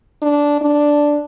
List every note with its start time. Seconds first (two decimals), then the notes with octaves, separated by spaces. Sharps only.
0.22 D4
0.61 D4